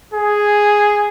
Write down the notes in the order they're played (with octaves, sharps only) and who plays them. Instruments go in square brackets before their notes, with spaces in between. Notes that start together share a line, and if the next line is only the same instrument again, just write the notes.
[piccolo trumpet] G#4